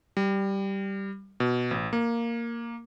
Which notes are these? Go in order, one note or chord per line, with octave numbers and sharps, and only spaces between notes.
G3
B2
A1
A#3